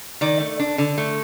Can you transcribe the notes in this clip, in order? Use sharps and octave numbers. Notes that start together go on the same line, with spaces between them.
D#3 D5
A3
D4
D3
A3